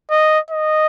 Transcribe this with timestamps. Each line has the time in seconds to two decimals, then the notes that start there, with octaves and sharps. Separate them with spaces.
0.11 D#5
0.51 D#5